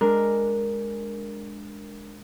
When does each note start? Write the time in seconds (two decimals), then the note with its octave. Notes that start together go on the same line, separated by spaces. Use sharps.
0.01 G#3 D4 A#4